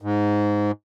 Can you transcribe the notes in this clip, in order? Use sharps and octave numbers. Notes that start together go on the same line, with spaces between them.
G#2